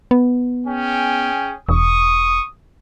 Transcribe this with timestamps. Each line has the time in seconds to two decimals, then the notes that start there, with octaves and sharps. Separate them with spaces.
0.11 B3
0.67 C#4 G#4 G5
1.69 E1 C#6 D#6